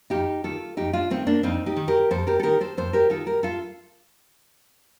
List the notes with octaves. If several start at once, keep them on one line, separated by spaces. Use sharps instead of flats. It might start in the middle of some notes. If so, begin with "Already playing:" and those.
F2 D#4 G4
D#3 F4 A4
F2 D#4 G4
D4 F4
D#3 A3 C4
A#3 D4
F2 C4 D#4
D#4 G4
D#3
G4 A#4
F2 A4 C5
G4 A#4
A4
D#3 G4 A#4
A4 C5
F2 A4 C5
G4 A#4
D#3 F4 A4
G4 A#4
F4 A4